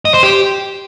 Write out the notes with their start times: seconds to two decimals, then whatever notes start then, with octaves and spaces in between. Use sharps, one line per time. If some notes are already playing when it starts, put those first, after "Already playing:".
0.05 D#5
0.14 C5
0.23 G4